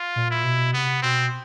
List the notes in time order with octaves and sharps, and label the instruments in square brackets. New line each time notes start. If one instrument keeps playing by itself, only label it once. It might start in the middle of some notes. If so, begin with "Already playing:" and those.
Already playing: [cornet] F4
[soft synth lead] A#2
[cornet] E4
[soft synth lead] B2
[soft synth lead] C3 [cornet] B3
[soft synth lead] B2 [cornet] C4